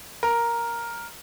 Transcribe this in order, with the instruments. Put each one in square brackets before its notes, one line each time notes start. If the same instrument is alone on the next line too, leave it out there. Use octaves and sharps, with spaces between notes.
[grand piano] A#4